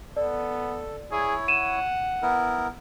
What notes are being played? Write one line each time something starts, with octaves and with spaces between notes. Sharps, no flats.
B3 A4 D5
E4 G#4 C#5
F#5 D#7 E7
B3 E4 A#4